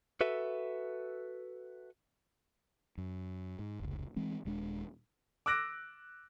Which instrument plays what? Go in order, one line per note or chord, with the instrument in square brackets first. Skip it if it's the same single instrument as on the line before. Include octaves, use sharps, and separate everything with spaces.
[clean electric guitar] F#4 A4 B4 E5
[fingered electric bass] F#2
G#2
F1 C#2
E3 G#3 C4
D#1 G#3 D4
[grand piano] D6 E6 F#6 A#6 D7